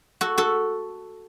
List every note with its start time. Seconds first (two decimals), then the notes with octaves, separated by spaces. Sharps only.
0.21 F#4 A4
0.38 F#4 A4